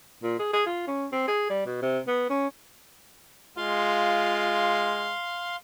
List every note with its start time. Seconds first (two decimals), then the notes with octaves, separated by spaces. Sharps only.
0.23 A#2
0.39 G#4
0.53 G#4
0.66 F4
0.87 C#4
1.12 C4
1.28 G#4
1.49 G3
1.66 B2
1.82 C3
2.07 B3
2.30 C#4
3.57 G#3 F4 F5 C6